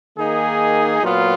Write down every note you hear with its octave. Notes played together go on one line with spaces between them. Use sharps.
D#3 A#3 D#4 G#4
A#2 F#3 B3 F4